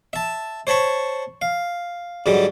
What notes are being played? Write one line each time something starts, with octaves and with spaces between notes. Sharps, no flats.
E5 A5
C5 C#5 A5 B5 C#6
F5
G#2 D3 F#3 G3